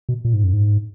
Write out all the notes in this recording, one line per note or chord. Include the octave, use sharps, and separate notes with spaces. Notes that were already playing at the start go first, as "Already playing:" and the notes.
B2
A#2
G#2
F#2
G#2